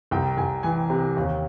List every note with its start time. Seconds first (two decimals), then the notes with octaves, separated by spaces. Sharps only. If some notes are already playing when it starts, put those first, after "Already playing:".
0.11 C2 G5
0.37 C2 G#5
0.63 E3 G#5
0.90 C3
1.17 D#2